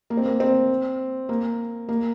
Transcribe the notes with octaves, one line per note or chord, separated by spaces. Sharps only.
A#3
C4
A#3
C4
A#3
A#3